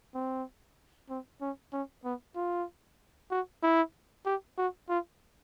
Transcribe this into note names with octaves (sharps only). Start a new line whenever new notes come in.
C4
C4
C#4
C#4
B3
F4
F#4
E4
G4
F#4
F4